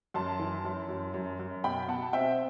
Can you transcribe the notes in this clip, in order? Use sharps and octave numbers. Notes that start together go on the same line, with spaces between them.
F#2 A5 C6
E3
F#2
F#2
F#2
F#2
B2 G5 B5
B2 F#5 A5
C4 E5 G5